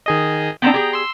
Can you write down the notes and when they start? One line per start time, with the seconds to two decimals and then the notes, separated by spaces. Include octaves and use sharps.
0.06 D#3 G#4 D#5
0.62 B3 C4 D4 G5 A#5
0.74 G4 G#4
0.93 C6 E6